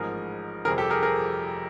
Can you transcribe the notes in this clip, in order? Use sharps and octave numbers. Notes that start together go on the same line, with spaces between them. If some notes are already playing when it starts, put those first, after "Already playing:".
Already playing: A1 G#2 F3 G#4 A#4
G1 F2 C3 F3 G#4 A#4
G4 A4
G#4 A#4
G#4 A#4